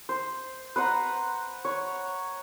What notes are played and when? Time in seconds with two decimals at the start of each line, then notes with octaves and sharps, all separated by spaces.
0.09 C5
0.76 B4 C5 F#5 A#5
1.65 C#5